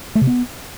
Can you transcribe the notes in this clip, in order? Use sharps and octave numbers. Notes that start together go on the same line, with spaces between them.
A3
C3
B3